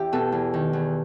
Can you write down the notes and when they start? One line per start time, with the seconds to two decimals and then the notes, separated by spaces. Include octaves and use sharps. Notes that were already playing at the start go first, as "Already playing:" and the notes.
Already playing: E2 E4 G4
0.13 B2 A4
0.32 E2
0.54 D#3
0.73 E2